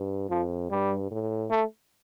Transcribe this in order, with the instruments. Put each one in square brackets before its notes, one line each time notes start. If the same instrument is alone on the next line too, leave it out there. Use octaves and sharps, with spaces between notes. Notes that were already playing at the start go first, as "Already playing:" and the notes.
Already playing: [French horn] G2
[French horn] F2 [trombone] F3
[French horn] G2 [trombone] G3
[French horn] A2
[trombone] A3